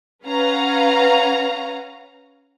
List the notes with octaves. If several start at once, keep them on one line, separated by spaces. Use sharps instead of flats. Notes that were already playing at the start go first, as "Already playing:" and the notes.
C#4 B4 F5 F#5 A#5